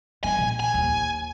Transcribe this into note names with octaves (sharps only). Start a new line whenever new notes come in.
E3 G#5
A#2
G#5
D#2